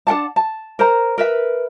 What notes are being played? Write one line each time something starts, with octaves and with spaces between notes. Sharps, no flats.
D4 A#4 F#5 A5
A5
A#4 C5 A#5
A#4 B4 E5